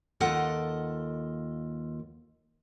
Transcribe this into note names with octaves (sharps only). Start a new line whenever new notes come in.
D#2 F4 A4 A#4 D#5 F#5